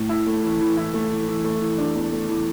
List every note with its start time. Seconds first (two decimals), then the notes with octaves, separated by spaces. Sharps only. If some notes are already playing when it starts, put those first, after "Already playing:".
Already playing: A2
0.09 E4
0.26 A3
0.43 E3
0.60 E3
0.77 E4
0.94 A3
1.11 E3
1.27 E3
1.44 A3
1.61 E3
1.78 D4
1.95 E2
2.12 A3
2.29 E3